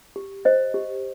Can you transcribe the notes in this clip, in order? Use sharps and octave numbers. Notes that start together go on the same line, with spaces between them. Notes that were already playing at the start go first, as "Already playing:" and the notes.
G4
C5 D#5
G4